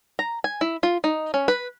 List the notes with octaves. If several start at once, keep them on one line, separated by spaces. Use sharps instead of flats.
A#5
G#5
E4
F4
D#4
C#4
B4